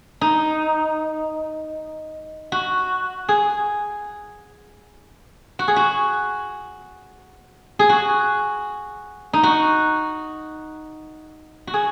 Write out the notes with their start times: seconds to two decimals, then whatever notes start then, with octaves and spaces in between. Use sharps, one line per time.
0.21 D#4
2.52 F#4
3.29 G#4
5.59 F#4
5.68 G#4
5.76 F#4
7.79 G#4
7.89 F#4
9.33 D#4
9.43 F#4
11.67 F#4
11.74 G#4